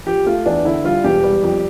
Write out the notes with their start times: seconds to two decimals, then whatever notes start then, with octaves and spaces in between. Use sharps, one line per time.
0.07 F3 G4
0.26 A3 F4
0.46 E2 D4
0.65 D3 E4
0.84 G3 F4
1.04 E1 G4
1.24 G3
1.43 F2